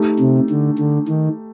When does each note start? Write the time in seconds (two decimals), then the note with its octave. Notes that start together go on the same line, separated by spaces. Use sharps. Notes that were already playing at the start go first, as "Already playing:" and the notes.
Already playing: A3 D#4 G4
0.20 C3
0.50 D3
0.78 D3
1.08 D#3